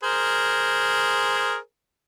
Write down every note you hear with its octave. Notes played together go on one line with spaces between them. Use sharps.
G#4 A#4 C5